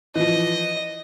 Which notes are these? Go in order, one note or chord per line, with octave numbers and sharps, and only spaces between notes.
E3 F3 D#5